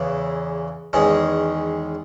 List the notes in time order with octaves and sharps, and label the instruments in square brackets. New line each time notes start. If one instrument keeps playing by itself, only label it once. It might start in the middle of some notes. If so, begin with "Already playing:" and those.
Already playing: [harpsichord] E2 C#3 E3
E2 D#3 G#3 C#4 G#4